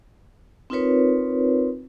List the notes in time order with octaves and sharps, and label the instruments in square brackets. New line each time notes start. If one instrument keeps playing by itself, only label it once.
[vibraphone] C4 D#4 F4 A#4 B4 C#5